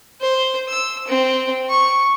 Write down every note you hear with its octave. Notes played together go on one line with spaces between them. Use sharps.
C5
E6
C4
C#6